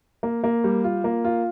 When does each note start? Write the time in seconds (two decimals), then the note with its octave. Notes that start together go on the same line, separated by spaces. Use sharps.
0.23 A#3
0.44 A#3
0.64 G3
0.84 F4
1.04 A#3
1.25 F4